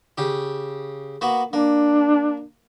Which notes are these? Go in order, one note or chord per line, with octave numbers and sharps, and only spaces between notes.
C#3 G4
A#3 B3 F#4
A#3 D4